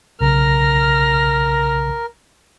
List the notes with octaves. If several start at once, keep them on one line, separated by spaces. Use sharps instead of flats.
B1 C#3 A#4 F6 A#6